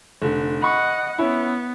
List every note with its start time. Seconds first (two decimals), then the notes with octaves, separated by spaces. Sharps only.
0.22 F1 D3
0.62 D#5 F#5 B5 C#6
1.18 B3 C#4 E4